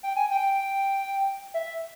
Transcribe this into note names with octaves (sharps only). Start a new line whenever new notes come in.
G5
G#5
G5
E5